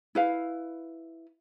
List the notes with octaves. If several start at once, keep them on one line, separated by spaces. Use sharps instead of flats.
E4 B4 F5